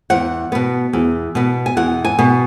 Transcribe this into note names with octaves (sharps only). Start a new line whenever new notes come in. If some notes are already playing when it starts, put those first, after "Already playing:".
E2 F#5
B2 B3
E2
B2 B3
G#5
E2 F#5
G#5
B2 B3